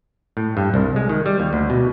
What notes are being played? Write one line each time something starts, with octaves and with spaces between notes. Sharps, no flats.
A2
G2
C2
G#3
D#3
G3
D#2
D2
B2